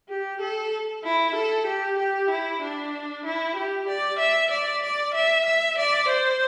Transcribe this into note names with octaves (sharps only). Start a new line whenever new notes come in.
G4
A4
E4
A4
G4
G4
E4
D4
E4
G4
D5
E5
D5
D5
E5
E5
D5
C5